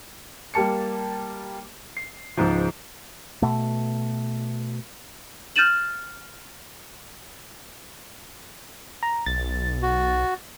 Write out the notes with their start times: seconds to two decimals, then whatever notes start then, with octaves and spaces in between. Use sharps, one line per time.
0.54 G3 A#3 A5 C#7
1.97 C7
2.37 C#2 G#2 F3
3.42 B2 A3
5.56 F6 G6 A6 D#7 E7 F#7
9.03 A#5
9.26 B1 A6
9.82 F#4